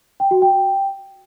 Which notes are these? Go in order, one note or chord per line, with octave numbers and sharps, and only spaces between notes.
G5
F#4
G5